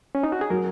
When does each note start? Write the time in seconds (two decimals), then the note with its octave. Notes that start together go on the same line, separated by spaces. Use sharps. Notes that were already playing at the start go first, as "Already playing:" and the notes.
0.15 C#4
0.23 D#4
0.32 F#4
0.41 G#4
0.50 F#3 A#4